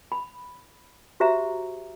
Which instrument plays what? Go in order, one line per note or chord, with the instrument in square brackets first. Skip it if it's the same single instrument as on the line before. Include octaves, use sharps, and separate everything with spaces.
[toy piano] B5
F#4 G4 C5 E5 A#5